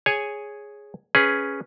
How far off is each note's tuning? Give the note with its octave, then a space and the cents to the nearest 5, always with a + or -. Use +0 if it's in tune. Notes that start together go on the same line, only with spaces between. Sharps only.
G#4 +0 C#5 +0 G#5 +0
C#4 +0 G#4 +0 B4 +0